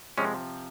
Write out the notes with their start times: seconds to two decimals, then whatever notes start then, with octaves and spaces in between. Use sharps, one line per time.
0.18 C3 F3 G#3 C#4